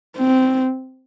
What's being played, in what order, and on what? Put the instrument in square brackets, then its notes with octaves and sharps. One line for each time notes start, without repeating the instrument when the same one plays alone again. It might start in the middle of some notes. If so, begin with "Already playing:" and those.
[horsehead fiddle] C4